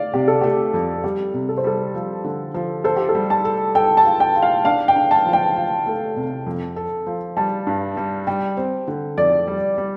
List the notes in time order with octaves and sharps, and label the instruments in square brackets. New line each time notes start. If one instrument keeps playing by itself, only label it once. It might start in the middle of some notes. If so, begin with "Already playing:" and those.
Already playing: [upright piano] D5 F5
[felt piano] C3 [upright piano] G4
[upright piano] A4
[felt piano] A3 [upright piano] G4
[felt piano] F2
[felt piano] G3 [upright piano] G4
[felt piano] C3
[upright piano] A4
C5
[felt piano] G3 [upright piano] A4
[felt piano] F3
D3
F3
[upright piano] A4 [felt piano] C5
[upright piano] G4
A4
[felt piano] G3
[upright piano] A5
[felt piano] A4
[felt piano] A4 [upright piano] G5
[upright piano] A5
[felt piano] F4
[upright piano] G5
[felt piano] F4
[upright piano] F5
[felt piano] D4 [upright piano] F5
[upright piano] G5
[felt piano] D4
[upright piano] A5
[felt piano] F3
[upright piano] G5
[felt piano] F4
A3
C3
F2
A4
F3
[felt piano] G3 [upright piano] A5
[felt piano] G2
G3
[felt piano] G3 [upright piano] G5
[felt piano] C4
D3
[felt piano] F2 [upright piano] D5
[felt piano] G3
G3